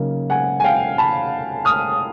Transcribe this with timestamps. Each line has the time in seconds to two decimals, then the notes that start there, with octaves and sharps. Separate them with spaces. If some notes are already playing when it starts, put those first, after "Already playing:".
Already playing: C#3 F#3 A#3 D#4
0.30 F#5 G#5
0.60 G#5
0.64 F5 G5
0.98 A5 B5
1.65 D#6 F6